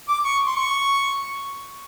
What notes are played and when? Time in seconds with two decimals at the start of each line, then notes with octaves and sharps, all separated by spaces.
0.08 D6
0.25 C#6
0.46 C6
0.57 C#6